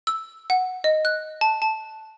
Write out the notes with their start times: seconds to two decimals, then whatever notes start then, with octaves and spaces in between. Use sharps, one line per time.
0.07 E6
0.50 F#5
0.84 D#5
1.05 F#6
1.41 A5
1.62 A5